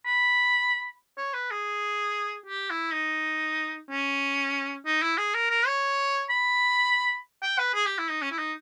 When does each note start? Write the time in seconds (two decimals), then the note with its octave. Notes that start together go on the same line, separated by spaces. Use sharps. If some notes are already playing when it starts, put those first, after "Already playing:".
0.06 B5
1.18 C#5
1.34 B4
1.51 G#4
2.46 G4
2.70 E4
2.93 D#4
3.90 C#4
4.86 D#4
5.02 E4
5.18 G#4
5.34 A#4
5.50 A#4
5.67 C#5
6.29 B5
7.42 G5
7.59 B4
7.74 G#4
7.86 G4
7.98 E4
8.10 D#4
8.22 C#4
8.32 E4
8.38 D#4